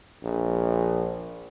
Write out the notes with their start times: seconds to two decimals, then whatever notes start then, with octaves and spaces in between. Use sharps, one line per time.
0.23 A#1